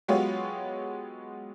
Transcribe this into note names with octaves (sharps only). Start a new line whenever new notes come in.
F#3 G#3 B3 F4 G4 C#5